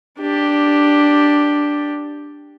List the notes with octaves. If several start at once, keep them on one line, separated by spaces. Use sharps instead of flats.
D4 G4